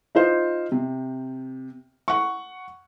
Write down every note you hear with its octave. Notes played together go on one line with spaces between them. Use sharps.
D#4 F4 C5
C3
F#5 C#6